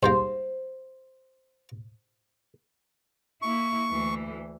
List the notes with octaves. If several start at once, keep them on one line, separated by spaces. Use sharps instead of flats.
G#2 G3 A#3 C5
A#3 E4 C#6
D2 E3